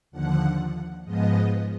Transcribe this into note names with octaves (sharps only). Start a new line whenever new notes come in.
D#2 D3 F3 F#5
G#2 F3 G#3 B3 D#5